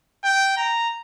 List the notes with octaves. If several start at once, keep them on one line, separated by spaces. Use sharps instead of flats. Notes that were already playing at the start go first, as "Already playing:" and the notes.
G5
A#5